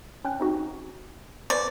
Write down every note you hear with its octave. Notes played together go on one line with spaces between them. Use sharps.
C#4 G5 F#6
C4 D#4 F#4
B4 C5 D5